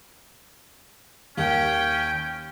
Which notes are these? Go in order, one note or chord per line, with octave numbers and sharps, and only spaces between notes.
D#2 C#4 G5